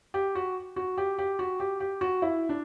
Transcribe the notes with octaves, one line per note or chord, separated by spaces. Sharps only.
G4
F#4
F#4
G4
G4
F#4
G4
G4
F#4
E4
D4